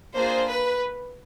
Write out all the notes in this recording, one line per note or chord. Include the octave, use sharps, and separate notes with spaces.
A#3 D4 F4 G#4 C5
B4